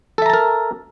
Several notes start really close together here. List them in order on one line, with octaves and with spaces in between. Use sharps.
A4 E5 A#5 A5 A#4